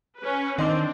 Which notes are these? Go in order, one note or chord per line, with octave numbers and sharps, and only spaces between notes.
C#4 B4
D#3 C4 D4 D#5 C6 D6